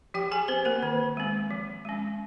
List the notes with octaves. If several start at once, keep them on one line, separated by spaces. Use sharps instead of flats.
F3 G4 G5
G#4 G#5
C4 C5
A#3 A#4
D#3
G#3 C4
F3
G#3 C#4